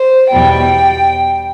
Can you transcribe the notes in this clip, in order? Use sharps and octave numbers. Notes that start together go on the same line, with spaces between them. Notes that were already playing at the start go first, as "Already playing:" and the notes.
Already playing: C5
E2 B2 G3 G5